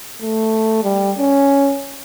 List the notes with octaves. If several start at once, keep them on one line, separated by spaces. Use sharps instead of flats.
A3
G3
C#4